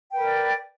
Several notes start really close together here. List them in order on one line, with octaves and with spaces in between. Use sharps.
G5 B4 A#4 D5